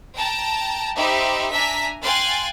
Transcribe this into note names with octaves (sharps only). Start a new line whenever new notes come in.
G5 A5 A#5
D#4 G4 C5 E5 B5
D4 E5 G#5 A#5 B6
F5 G5 G#5 C6 F#6 A6